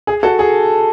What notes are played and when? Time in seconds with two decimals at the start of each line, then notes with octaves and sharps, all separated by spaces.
0.07 G#4
0.23 F#4 A4
0.39 G#4